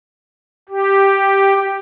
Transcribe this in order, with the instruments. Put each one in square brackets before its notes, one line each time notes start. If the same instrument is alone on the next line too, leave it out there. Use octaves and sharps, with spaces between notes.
[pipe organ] G4